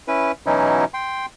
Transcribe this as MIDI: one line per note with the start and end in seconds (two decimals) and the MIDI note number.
0.08 0.32 61
0.08 0.32 64
0.08 0.32 71
0.46 0.85 47
0.46 0.85 52
0.46 0.85 54
0.46 0.85 61
0.46 0.85 63
0.46 0.85 64
0.94 1.26 79
0.94 1.26 84